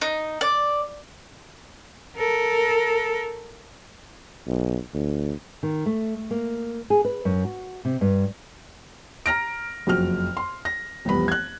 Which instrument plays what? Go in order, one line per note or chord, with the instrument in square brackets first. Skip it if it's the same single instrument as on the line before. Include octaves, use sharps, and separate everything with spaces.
[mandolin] D#4
D5
[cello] A4 A#4
[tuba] B1
D2
[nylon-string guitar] D#3
A3
A#3
G#4
B4
F#2
F#4
C3
G2
[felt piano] A#5 F6 A#6 D7
F#1 F2 F#4 F6
C6
A#6
F1 C2 E3 B3 B5
F#6 G#6